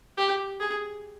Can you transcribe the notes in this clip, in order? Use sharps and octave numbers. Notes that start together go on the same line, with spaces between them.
G4
G#4